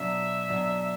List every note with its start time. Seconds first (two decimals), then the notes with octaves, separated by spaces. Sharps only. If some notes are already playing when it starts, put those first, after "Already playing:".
Already playing: B2 F#3 D4 E5
0.49 B2 F#3 D4